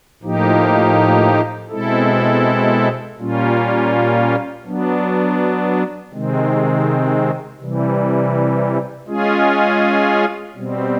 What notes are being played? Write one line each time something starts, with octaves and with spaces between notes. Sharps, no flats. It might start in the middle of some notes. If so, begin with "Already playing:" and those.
A2 F3 A#3 D#4 G4
B2 G#3 C4 E4 A4
A#2 G3 A#3 C#4 F4
F#3 B3 D4
C3 D#3 G#3 C4
C3 E3 G3
G#3 C#4 F4 G#4
B2 G3 C4